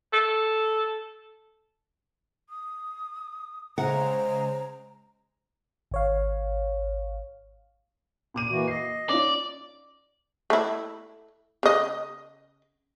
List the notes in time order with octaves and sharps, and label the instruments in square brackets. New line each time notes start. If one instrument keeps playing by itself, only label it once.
[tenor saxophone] A4
[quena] D#6
[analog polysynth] C#3 G#3 [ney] C5 [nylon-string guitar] F#5 [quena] A#5
[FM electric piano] G#1 C#5 F5
[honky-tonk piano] A#2 D6 D#7
[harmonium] E3 A#3 F#4
[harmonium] D#5 [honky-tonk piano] C7
[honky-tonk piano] C#4 F4 [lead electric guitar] D5
[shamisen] A3 E4
C#3 D#5